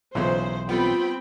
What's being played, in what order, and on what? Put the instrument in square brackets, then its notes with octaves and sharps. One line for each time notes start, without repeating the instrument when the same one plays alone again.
[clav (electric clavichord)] B1 E3 [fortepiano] A#2 C#3 [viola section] C5
[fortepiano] G3 B3 [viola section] C4 G5 B5 [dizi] F4